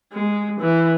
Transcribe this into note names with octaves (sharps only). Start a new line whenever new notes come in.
G#3
E3